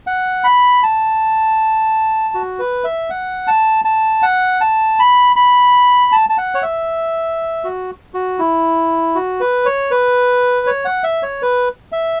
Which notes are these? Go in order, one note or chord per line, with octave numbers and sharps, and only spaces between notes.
F#5
B5
A5
F#4
B4
E5
F#5
A5
A5
F#5
A5
B5
B5
A5
A5
F#5
C#5
E5
F#4
F#4
E4
F#4
B4
C#5
B4
C#5
F#5
E5
C#5
B4
E5